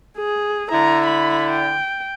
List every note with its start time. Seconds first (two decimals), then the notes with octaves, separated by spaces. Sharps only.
0.18 G#4
0.71 D3 E4 A#5
1.06 B5
1.50 G5